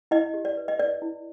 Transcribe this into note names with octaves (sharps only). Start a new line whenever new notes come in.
E4 D#5
G4
D5
B4
D#5
B4 D5
E4